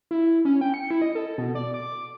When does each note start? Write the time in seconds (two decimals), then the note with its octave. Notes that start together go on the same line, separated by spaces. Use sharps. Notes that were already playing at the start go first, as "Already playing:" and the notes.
0.11 E4
0.45 C#4
0.61 G5
0.74 C#7
0.91 E4
1.02 D#5
1.15 A4
1.38 B2
1.55 D5
1.74 D6